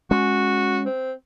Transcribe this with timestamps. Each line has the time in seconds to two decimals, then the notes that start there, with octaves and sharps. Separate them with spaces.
0.11 G#3 C#4 F#4
0.86 C4